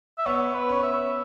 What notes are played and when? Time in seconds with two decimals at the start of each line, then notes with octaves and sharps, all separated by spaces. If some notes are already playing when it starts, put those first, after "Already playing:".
0.18 E5
0.26 B3 C#5
0.54 B4
0.69 C#4 C#5
0.83 E5